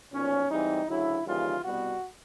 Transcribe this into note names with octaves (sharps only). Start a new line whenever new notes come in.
B1 A#2 F3 C#4
G#2 E3 G3 C4 D#4
D2 C#3 F#3 E4
D#2 C#3 E3 G3 F4
C2 B2 G3 B3 F#4